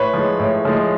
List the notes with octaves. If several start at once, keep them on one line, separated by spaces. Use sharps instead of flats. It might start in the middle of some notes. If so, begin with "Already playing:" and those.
Already playing: A2 B4 C#5
F3 G#3
A2
F3 G#3